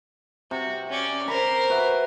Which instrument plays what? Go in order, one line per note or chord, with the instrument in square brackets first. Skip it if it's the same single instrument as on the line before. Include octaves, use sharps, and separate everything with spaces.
[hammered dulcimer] C3 [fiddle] F#4
[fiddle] C#4 D5
[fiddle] A#4 C5 [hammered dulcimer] B5
[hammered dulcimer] F#4 B4 E5